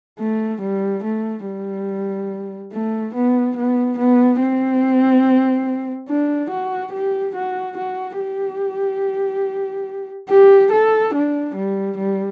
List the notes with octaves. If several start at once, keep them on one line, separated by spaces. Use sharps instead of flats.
A3
G3
A3
G3
A3
B3
B3
B3
C4
D4
F#4
G4
F#4
F#4
G4
G4
A4
D4
G3
G3